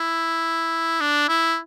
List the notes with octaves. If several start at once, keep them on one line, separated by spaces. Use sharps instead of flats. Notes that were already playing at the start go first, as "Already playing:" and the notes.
Already playing: E4
D4
E4